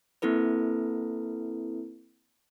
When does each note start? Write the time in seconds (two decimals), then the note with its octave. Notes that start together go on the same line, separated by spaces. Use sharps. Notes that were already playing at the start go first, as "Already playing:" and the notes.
0.22 A#3 C4 E4 A4 B4